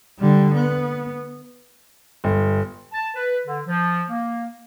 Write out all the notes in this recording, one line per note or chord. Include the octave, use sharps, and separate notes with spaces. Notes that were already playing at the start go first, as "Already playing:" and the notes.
D3 G3
B3
G1
A5
B4
D3
F3
A#3